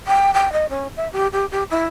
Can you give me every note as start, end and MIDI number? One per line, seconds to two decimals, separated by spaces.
0.07 0.33 79
0.33 0.51 79
0.52 0.69 75
0.69 0.87 61
0.96 1.08 76
1.12 1.27 67
1.32 1.45 67
1.51 1.63 67
1.70 1.87 64